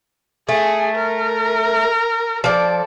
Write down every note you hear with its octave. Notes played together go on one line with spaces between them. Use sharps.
A3 G#4
A#4
F3 A4 D5